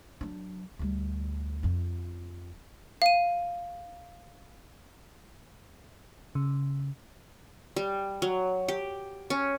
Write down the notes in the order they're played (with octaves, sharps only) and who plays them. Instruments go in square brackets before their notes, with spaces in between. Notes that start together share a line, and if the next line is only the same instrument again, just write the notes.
[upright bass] F#3 D4
D2 G3
F2 F4
[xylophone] F5 D#7
[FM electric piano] C#3
[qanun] G3
F#3
G4
C#4